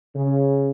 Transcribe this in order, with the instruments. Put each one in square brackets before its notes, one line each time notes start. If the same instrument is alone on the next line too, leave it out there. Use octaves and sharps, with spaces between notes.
[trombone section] C#3